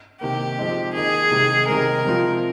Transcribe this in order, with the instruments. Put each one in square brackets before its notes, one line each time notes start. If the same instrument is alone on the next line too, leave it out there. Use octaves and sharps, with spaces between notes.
[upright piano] C3 D#3 A#3 [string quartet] G4
[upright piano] F3 G#3 C4 D#4
[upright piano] D#3 A#3 D#4 [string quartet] G#4
[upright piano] C3 D#3 G#3
[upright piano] C3 D#3 G#3 [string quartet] A#4
[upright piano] C3 F3 G#3 C4 F4